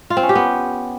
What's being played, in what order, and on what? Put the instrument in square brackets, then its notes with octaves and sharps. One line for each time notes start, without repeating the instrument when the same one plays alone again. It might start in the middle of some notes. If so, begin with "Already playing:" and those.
[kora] F4
C4
C#4
G4
B3